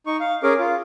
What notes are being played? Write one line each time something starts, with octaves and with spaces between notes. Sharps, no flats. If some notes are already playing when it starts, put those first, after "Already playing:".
D#4 C#6
F5
C#4 G#4 A#4 D6
F4